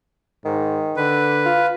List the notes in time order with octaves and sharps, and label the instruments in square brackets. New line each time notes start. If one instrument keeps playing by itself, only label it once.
[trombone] G#2 [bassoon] D#3
[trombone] D3 [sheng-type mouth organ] B4
[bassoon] F4